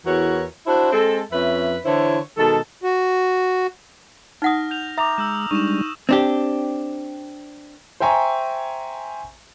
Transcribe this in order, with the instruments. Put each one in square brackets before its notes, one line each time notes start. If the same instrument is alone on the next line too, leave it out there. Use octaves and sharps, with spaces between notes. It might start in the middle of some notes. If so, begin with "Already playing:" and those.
[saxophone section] E2 E3 F#4 A#4 C#5
D4 E4 F#4 C5
G#3 C4 A4
F2 C#4 B4 E5
D3 E3 E4 C5 C#5
B2 D#3 G#3 A4
[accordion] F#4
[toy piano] D#4 F#5 D#6 [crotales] F6 A#6
[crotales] G6 F7
[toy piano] E5 [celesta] A#5 D6 [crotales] D#6 F7
[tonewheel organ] G#3 [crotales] E6 G6 E7
[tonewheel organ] G3 G#3 D4 [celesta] D#4 [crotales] C#6 E7
[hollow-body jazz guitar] C4 D4 G4
[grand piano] C5 E5 G5 G#5 A#5 C#6